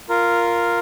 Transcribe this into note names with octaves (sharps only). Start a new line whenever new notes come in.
F4 A#4